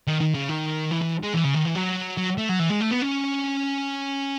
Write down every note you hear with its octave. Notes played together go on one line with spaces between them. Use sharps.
D#3
D#3
C#3
D#3
E3
E3
G#3
E3
C#3
D#3
E3
F#3
F#3
A3
F#3
E3
G#3
A3
B3
C#4